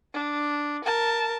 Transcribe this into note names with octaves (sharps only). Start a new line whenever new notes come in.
D4
A#4 A5